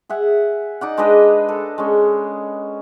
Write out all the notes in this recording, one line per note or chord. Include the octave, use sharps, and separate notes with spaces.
G#4 E5 F#5
D#4 D5 F#5
G#3 D4 B4 D#5
A4
G#3 C#4